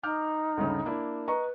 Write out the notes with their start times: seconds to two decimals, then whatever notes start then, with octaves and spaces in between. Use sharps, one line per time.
0.03 D#4 D6 F6 G6
0.57 D2 G2 C#3
0.85 A#3 D4 E4
1.28 B4 D#5 A#5 C#6